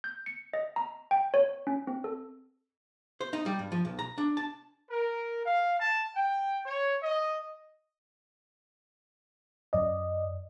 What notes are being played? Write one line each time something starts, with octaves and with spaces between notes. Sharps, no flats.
G6
C#7
D#5
A#5
G5
C#5
C#4
C4
A4
C5
D#4
G3
G2
F3
B1
A#5
D4
A5
A#4
F5
A5
G5
C#5
D#5
F#2 D5 D#5